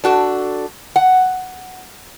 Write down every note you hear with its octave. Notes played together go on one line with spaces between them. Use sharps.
D4 F#4 A4
F#5